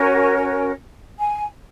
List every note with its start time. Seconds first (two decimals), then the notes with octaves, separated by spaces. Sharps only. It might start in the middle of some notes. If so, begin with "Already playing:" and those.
Already playing: C#4 F#4 A#4 C#5
1.19 G#5